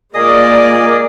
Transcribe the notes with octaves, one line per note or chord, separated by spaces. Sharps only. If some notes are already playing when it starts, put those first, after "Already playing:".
A#2 G#3 A#3 G#4 A#4 D5 D#5 D#6